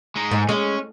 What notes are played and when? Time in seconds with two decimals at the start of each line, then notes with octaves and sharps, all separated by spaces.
0.16 G#3 D#4
0.31 G#2
0.49 G#3 C#4